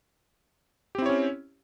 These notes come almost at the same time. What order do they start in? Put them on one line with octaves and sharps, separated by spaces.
G4 C4 E4 C#5 C#4